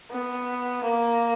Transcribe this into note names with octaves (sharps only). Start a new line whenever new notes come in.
B3
A#3